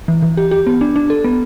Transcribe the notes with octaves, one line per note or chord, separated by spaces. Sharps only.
E3
E3
G4
G4
B3
D4
D4
A4
B3